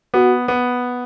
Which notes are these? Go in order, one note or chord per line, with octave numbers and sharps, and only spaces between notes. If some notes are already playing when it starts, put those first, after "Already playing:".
B3 F#4
B3